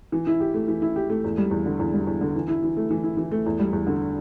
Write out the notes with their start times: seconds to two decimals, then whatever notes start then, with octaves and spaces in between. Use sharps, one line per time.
0.12 E3
0.27 E4
0.40 G4
0.54 A3
0.68 E3
0.82 E4
0.96 G4
1.10 A3
1.24 E2
1.38 G3
1.51 E2
1.66 D3
1.79 E2
1.94 G3
2.07 E2
2.21 D3
2.35 E3
2.48 E4
2.63 E3
2.77 A3
2.91 E3
3.04 E4
3.17 E3
3.32 A3
3.46 E2
3.60 G3
3.73 E2
3.87 D3